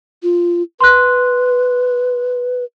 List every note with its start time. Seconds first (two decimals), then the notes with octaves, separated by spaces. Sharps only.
0.23 F4
0.80 B4 C6 F#6